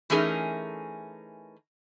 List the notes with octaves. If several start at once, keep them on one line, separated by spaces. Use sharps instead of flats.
E3 A3 C#4 D#4 G#4 A#4